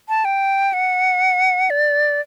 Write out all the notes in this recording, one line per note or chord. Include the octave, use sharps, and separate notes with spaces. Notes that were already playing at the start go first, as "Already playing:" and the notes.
A5
G5
F#5
D5